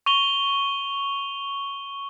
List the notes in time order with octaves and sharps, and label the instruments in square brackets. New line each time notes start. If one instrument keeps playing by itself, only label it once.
[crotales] C#6 F7 G7